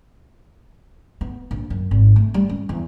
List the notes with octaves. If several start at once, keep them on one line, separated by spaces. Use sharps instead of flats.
B3
A#1
F#2
G#1
A3
G3
C#4
E2